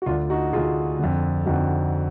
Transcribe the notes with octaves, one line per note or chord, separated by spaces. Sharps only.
F#4
D2 D3 D4 F4
D#4 F#4
D2 D3 F4 G#4
F2 D3
F2 D3 D#4 F#4